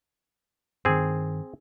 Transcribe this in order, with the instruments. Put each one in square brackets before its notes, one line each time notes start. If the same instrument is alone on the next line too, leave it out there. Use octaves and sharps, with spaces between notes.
[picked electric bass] G2 D#3 [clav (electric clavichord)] C4 G#4